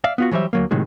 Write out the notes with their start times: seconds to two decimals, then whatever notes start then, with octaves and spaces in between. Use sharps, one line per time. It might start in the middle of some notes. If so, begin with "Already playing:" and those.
0.04 D5 E5 F5
0.18 B3 F4 F#4
0.31 E3 F#3 G3 C5 E5
0.53 D2 F#3 A#3
0.71 A2 C3 D#3 F#3 G#3